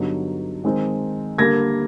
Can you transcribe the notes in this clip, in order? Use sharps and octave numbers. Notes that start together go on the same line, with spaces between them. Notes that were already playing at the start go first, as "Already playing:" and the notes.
Already playing: G2 D3 F#3 B3 D#4
D#3 G#3 C4 D#4
D3 G3 A#3 G#6 A#6